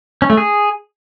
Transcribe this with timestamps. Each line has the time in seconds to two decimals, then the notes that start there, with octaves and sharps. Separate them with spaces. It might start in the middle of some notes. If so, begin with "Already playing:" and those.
0.22 C#4
0.30 A3
0.37 G#4